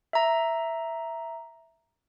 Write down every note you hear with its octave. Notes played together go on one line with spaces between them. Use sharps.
E5 A#5